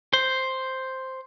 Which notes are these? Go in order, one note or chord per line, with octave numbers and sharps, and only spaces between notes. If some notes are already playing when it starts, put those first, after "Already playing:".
C5